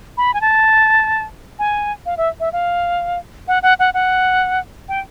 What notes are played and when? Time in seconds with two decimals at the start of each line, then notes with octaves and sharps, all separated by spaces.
0.17 B5
0.34 G#5
0.41 A5
1.59 G#5
2.06 F5
2.17 E5
2.40 E5
2.53 F5
3.48 F#5
3.63 F#5
3.79 F#5
3.94 F#5
4.89 G5